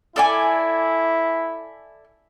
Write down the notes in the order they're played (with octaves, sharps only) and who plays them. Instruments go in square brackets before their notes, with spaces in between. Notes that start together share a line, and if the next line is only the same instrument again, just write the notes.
[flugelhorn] E4 [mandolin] A4 D5 G#5